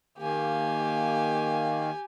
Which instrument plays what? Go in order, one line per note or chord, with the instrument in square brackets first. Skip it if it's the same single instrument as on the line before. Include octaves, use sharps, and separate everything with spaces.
[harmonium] D#3 A#3 [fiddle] G4 G#5